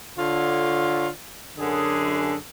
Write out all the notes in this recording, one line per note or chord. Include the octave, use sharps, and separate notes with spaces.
D3 F4 C#5
F#2 D3 G#4